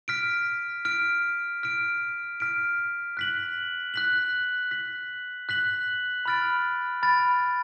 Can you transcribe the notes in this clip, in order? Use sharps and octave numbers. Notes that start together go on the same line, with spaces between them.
F6 B6 D7
F6 B6 D7
F6 B6 D7
F6 B6 D7
F#6 B6 F#7
F#6 B6 F#7
F#6 B6 F#7
F#6 B6 F#7
B5 F6 A6 D7
B5 F6 A6 D7